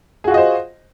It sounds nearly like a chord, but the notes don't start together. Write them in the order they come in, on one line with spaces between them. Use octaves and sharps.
G#4 F#4 F4 D#5 C5